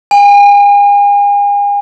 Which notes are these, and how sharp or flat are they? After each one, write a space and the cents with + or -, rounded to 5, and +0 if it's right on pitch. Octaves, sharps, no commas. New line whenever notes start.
G#5 -40